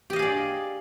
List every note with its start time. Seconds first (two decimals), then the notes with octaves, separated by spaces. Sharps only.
0.10 G4
0.13 D#5
0.16 F5
0.19 G#4
0.22 D5